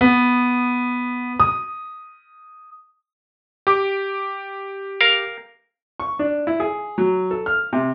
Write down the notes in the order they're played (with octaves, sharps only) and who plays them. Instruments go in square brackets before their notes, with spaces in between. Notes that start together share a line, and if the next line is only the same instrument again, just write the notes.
[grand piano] B3
D#6
[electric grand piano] G4 D6
[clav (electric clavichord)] A#4 F5
[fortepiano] C#6
D4
E4
G#4
F#3
A4
F6
C3